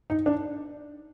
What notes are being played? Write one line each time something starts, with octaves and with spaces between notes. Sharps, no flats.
D#4
D4